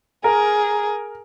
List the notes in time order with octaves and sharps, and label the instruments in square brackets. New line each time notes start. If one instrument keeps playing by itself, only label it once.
[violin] G#4 [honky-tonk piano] A#4